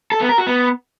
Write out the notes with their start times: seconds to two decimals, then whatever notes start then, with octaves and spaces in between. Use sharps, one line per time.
0.12 A4
0.20 B3
0.29 A#4
0.38 F#4
0.47 B3